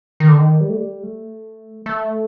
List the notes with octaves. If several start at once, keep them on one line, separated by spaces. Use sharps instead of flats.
D#3
D3
D#3
G3
A3
G3
A3
A3